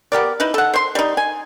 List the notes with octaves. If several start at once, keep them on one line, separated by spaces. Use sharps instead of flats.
B3 G4 A#4 D5
D#4 E4 B4
A4 F#5
C5 C6
G3 D#4
G#5